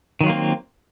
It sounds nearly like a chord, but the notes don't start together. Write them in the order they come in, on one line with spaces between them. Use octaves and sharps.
D#3 F#3 F4 A#3 C4